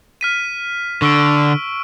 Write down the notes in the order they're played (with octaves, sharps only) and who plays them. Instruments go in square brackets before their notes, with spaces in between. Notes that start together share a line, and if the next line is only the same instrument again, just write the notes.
[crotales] F6 B6 D#7
[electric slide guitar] D3 [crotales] C#6 E6 D7